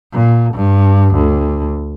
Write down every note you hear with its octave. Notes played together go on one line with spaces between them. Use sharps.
A#2
G2
D2